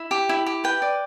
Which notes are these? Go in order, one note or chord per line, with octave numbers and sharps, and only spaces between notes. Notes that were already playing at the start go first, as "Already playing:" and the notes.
Already playing: E4
G4
E4
G4
B4 G5
D5